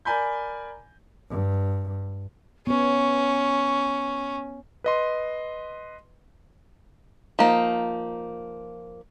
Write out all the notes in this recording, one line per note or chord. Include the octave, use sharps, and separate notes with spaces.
A#4 D5 G#5 B5 G6
G2
B3 C#4 C#5 C#6
B4 D#5 C6
F3 A#3 D#4